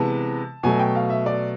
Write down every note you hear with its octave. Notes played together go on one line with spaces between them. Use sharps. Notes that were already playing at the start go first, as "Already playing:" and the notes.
Already playing: C3 E3 G#3 B3 A5
B2 F#3 A3 G#5
G5
F5
E5
D5